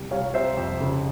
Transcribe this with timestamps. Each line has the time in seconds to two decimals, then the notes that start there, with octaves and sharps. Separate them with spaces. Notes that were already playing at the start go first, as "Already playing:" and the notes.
Already playing: C2
0.11 C2 C#5 F5
0.34 C3 C5 E5
0.57 F2
0.80 C#3